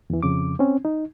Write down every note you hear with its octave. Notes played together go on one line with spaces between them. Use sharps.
E2 E3
F2 C#3 D6
C4 C#4
D#4